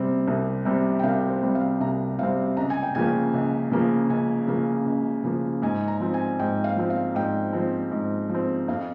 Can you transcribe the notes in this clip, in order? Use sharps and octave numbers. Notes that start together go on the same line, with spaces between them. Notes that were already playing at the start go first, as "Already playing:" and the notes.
Already playing: C2 C3 G3 C4
C2
C3 G3 C4
G5
C2 F5
C5
C3 G3 C4
F5
C2 A#5
C3 G3 C4 F5
C#2 A#5
G#5
G5
C#3 F3 A#3 G#5
C#2
C#3 F3 A#3
C#2 G#5
C#3 F3 A#3
C#2
C#3 F3 A#3
G#2 G#5
A#5
F3 C4
G#5
G#2 G5
F5
F3 C4
F5
G#2 G5
F3 C4
G#2
F3
C4
F2 F5